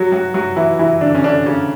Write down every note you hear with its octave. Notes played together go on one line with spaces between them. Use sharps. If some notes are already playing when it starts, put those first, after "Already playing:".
Already playing: F#3 F#4
F#3 F#4
F#3 F#4
E3 E4
E3 E4
D3 D4
C#4
D3 D4
C#3 C#4